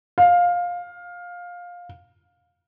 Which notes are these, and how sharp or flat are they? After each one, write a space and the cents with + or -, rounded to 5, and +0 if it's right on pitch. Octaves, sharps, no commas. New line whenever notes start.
F5 +15